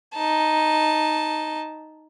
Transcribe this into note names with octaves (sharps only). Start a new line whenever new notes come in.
D#4 A5